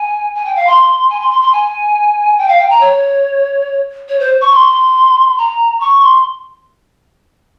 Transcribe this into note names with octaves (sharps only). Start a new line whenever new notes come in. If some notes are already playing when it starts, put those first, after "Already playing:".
Already playing: G#5
G#5
G5
F5
C6
G#5
C6
C6
C6
G#5
G5
F5
G5
A#5
C#5
C#5
C5
C#6
C6
A#5
C#6
C6